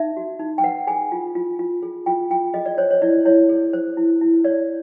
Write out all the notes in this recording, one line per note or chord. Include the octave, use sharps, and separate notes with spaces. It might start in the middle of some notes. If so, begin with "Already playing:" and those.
Already playing: D#4 E5
F#4
D#4
G5
B4 F#5
G#4 G#5
F4
F4
F4
G#4
F4 G5
F4 G5
G#4 D#5
D5
C5 C#5
C#5
E4 D5
E4 C#5
G#4
C5
E4
E4
C#5 D5